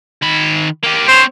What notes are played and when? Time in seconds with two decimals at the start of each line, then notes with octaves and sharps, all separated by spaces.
0.22 D#3 B5
0.83 A#3 G4
1.08 C4 C5 C#5